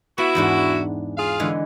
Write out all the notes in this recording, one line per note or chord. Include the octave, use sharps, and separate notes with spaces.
B3 E4 F#4
E2 G#2 D4
F4 G#4 F5
D3 E3 G#3